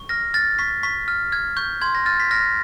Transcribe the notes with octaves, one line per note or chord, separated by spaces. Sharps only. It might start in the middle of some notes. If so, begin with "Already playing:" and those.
Already playing: C#6
F6 A#6
F6 A6
C#6 B6
C#6 B6
F6
F6 G#6
C#6 G6
C6 G#6
A#6
F6 A6
B6
F6 A#6